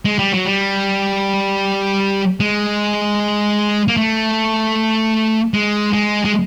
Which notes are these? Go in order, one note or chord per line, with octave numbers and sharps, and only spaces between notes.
G#3
G3
F#3
G3
G#3
A#3
A3
G#3
G#3
G#3